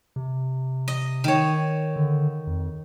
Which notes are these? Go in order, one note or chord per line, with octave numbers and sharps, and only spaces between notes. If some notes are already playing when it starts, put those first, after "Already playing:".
C3
D#5
D#3 C#5
D3
F2